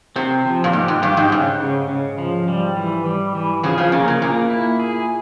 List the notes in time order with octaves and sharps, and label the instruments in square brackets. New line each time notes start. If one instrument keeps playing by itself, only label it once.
[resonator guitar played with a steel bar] C3 [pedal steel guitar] C4
[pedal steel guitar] F3
[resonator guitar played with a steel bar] A#2
[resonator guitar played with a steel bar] G#2 [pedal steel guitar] G4
[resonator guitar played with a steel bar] G#2
[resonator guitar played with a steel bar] G2 [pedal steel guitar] G4
[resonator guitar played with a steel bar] G#2
[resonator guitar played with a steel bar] G#2 [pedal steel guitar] C#3
[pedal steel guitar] C#3
C#3
F3
G3
E3
G3
E3
[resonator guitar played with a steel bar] C#3 F3 [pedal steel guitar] G#4
[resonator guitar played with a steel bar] C#3 F3
[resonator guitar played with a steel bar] C#3 [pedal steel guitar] A#3
[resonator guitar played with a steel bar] C#3
[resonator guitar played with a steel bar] A#2 [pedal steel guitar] A#3
[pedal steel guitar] E4
G#4